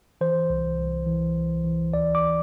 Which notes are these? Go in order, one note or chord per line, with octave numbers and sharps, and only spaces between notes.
E3 C5
C2
C2
E3
C2
E3
D2 D5
D6